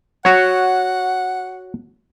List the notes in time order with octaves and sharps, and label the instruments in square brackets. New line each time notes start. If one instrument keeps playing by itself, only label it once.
[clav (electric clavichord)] F#4 C#5 [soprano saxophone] F#5